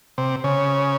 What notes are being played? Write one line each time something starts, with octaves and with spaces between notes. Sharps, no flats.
C3
C#3